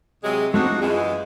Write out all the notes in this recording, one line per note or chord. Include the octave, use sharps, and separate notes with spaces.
C3 F#3 G#3
G#3 A3 C4 D4 D#4 F#4
F4
F#2 E3 G#3